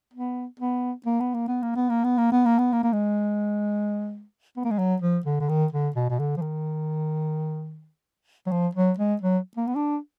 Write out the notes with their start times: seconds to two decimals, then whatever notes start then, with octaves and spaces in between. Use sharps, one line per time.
0.13 B3
0.60 B3
1.06 A#3
1.20 B3
1.34 A#3
1.48 B3
1.62 A#3
1.76 B3
1.89 A#3
2.04 B3
2.18 A#3
2.32 B3
2.46 A#3
2.59 B3
2.73 A#3
2.83 A#3
2.93 G#3
4.57 B3
4.65 A#3
4.71 G#3
4.79 F#3
5.02 F3
5.26 D3
5.40 D3
5.49 D#3
5.72 D3
5.96 B2
6.10 B2
6.19 D3
6.37 F3
6.42 D#3
8.47 F#3
8.51 F3
8.75 F#3
8.98 G#3
9.21 F#3
9.57 A#3
9.67 B3
9.75 D4